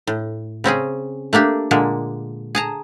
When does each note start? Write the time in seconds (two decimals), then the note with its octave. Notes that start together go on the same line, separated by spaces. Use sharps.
0.07 A2
0.64 C#3 C4 C#4 G#4
1.33 A3 A#3 D4 G4
1.71 A#2 D3 G#3 A#3
2.55 G#4 A5 A#5